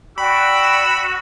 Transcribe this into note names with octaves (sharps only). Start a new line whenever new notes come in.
F#4 D5 G5 B5 E6